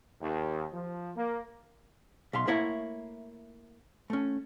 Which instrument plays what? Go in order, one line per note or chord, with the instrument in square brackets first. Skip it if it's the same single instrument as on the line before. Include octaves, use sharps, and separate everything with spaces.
[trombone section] D#2
F3
A#3
[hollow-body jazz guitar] B1 E5 F5 C6
A3 A#3 E4 C#5 F#5
A3 C#4